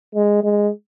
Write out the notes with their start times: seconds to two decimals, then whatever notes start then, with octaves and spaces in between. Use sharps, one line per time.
0.14 G#3
0.43 G#3